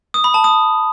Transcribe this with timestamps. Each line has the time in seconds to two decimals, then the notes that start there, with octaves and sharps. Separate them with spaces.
0.14 D#6
0.24 B5
0.34 A5
0.44 D#6